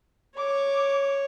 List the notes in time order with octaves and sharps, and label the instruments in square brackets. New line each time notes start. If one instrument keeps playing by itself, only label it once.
[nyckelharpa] C#5 [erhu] D6